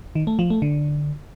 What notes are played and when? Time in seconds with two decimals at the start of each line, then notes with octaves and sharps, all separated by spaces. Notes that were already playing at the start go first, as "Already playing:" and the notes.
0.15 D#3
0.27 A3
0.39 F3
0.50 A3
0.62 D3